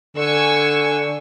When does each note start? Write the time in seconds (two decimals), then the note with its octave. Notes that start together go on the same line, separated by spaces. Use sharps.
0.17 D3 G#5 C#6 E6